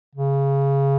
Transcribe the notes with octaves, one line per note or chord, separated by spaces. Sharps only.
C#3